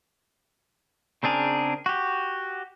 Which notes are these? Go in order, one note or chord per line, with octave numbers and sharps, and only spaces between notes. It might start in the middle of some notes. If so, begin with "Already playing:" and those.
C#3 C4 D4 G#4 A#4
F#4 G4